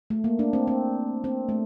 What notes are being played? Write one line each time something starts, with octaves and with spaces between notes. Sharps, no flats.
A3
A#3
D4
C4
C4
C4
A3